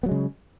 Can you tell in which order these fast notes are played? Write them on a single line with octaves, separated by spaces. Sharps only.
B3 F#3 G#3 C#3